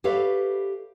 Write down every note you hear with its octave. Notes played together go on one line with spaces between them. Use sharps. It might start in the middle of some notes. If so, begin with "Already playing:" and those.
G4 A4 B4 C#5 E5 F5